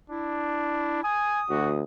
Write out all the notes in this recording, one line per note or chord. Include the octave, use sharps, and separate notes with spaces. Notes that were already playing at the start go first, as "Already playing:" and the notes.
D4 E4
G#5 D#6
D2 F#4